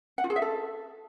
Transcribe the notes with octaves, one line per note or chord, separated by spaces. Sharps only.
F#5
F4
G#4
E5
A4